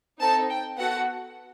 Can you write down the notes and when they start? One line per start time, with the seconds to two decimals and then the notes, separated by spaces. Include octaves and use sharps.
0.20 C4 D#4 A4 A5
0.49 G5
0.77 B3 F#4 A4 F#5